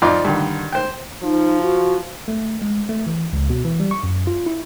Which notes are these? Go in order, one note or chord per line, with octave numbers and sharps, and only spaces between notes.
F2 D#4 F4 D5 C6 D6
G2 D3 D#3
C5 G5
F3 D#4
F#4
A3
G#3
A3
E3
C#2
B2
E3
G3
C#6
F#2
F4
E4